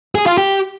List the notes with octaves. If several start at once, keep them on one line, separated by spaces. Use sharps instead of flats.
G#4
F4
G4